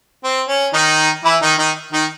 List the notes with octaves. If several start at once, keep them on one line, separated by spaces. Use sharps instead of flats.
C4
C#4
D#3 D#4
E3 E4
D#3 D#4
D#3 D#4
D#3 D#4